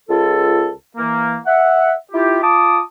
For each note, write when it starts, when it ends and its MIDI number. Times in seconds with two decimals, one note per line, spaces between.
0.09 0.71 37
0.09 0.71 65
0.09 0.71 69
0.97 1.38 52
0.97 1.38 58
1.46 1.93 76
1.46 1.93 78
2.12 2.38 64
2.12 2.38 65
2.12 2.38 67
2.43 2.80 65
2.43 2.80 81
2.43 2.80 86
2.43 2.80 87